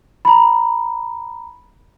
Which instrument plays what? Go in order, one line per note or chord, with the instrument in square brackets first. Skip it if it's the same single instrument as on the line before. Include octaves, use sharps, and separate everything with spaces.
[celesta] A#5 B5